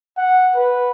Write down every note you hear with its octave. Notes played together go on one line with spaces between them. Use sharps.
F#5
B4